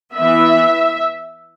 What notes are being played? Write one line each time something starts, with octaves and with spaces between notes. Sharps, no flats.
B3 E5
E3